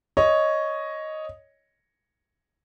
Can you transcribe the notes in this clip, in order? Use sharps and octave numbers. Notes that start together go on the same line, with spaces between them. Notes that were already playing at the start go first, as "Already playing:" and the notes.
C#5 D#5